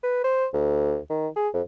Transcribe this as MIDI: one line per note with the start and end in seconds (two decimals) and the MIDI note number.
0.03 0.21 71
0.24 0.46 72
0.54 0.98 38
1.10 1.28 51
1.36 1.49 68
1.54 1.61 41